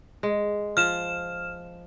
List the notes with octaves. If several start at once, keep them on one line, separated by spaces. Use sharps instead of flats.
G#3
F3 F6 E7